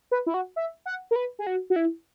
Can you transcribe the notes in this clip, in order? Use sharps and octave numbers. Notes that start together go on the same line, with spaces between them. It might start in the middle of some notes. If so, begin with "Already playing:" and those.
B4
E4
F#4
E5
F#5
A#4
B4
G#4
F#4
F#4
E4